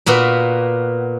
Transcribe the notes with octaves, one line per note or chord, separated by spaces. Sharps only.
A#2 A#3 B3 F#4